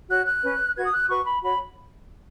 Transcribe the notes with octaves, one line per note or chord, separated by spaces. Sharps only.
F#4 C#5 F#6
F#6
C#4 B4
F#4 B4 G#6
D#6
F#6
F#4 B4 C#6
B5
F#4 C#5 B5